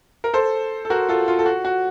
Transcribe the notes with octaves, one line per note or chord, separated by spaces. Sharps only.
A#4
A4 C5
A4
F#4 A#4
F4 A4
F4
A4
F#4
F#4